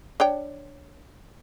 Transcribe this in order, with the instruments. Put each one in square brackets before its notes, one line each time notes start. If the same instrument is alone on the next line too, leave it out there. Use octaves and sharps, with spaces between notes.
[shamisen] D4 C#5 G5